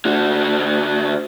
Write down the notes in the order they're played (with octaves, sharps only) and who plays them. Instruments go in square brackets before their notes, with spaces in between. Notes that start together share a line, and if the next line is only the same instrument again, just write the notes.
[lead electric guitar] D3 F#4